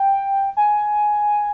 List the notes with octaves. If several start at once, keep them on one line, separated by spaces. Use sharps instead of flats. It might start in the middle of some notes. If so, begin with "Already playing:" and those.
Already playing: G5
G#5